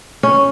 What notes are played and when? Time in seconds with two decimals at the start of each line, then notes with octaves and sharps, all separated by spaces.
0.23 C#4